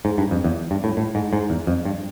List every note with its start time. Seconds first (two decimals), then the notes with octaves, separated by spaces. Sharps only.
0.05 G#2
0.18 G2
0.31 F2
0.44 E2
0.71 G2
0.84 A2
0.97 A2
1.15 G#2
1.33 G#2
1.50 E2
1.67 F2
1.85 G2